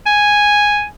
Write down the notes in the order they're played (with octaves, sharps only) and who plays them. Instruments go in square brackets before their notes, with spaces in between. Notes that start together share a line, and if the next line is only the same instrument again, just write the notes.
[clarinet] G#5